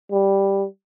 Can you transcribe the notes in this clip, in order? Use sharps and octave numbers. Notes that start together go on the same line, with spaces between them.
G3